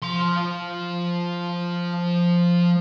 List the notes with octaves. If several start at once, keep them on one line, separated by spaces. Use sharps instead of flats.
F3 C6